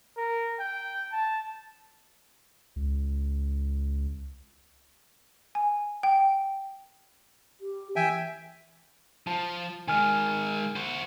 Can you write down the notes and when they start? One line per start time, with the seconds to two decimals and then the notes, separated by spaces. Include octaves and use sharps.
0.17 A#4
0.60 G5
1.12 A5
2.76 C#2
5.55 G#5
6.03 G5
7.61 G4
7.96 E3 E5 G5 G#5
9.27 F3 A5
9.88 D#3 G#3 G#5 F6
10.76 F#4 C5